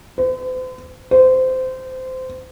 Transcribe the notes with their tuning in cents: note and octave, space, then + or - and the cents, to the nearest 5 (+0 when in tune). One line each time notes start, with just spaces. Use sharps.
C5 -45
C5 -20